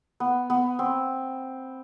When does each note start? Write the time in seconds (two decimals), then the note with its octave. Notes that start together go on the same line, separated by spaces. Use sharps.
0.20 B3
0.50 B3
0.79 C4